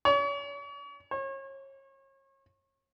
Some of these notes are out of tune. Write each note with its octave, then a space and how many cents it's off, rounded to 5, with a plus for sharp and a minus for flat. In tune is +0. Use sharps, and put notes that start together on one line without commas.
C#5 +40
C#5 -35